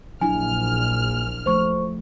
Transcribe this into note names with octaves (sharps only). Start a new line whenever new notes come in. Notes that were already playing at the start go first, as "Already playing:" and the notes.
A#1 F#3 D4 E4 G#5 F6
F3 A3 C5 C#6